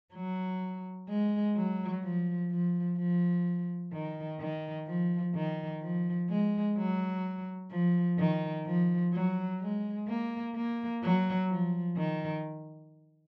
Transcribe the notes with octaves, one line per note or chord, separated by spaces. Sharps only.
F#3
G#3
F#3
F3
F3
F3
D#3
D#3
F3
D#3
F3
G#3
F#3
F3
D#3
F3
F#3
G#3
A#3
A#3
F#3
F3
D#3